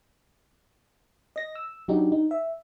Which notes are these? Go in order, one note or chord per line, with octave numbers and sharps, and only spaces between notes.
D#5 A#6
E6
F#3 D4 D#4 F#4 G4
D#4
E5